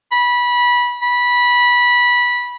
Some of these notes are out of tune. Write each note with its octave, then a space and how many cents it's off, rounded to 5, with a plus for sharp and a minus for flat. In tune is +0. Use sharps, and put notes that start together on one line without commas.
B5 -20
B5 -15